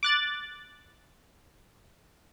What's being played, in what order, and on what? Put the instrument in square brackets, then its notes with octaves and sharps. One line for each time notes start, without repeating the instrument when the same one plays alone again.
[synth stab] D6 F#6 A6